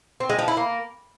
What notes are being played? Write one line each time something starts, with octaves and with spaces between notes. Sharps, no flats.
C4
G#3
F3
E4
A#3